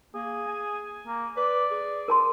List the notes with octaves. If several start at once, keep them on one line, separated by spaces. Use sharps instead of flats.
A#3 G#4
G#5
A#3
B4 D5
G#4
A#4 A5 C6